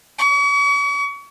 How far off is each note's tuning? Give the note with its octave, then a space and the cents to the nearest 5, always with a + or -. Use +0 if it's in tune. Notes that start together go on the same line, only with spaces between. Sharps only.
C#6 +40